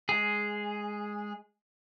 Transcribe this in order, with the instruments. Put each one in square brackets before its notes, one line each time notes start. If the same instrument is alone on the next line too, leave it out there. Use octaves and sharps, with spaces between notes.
[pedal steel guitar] G#3 G#4